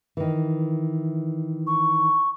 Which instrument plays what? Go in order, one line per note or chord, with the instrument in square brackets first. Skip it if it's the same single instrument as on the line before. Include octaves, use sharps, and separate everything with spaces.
[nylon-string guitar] D#3 E3
[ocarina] C#6